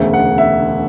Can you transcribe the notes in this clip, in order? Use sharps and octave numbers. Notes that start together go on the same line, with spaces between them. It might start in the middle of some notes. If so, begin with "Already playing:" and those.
Already playing: E1 D2 C#3 E5
F#5
E5